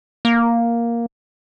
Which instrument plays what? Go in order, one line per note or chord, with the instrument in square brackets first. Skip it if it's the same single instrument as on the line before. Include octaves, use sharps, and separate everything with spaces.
[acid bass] A#3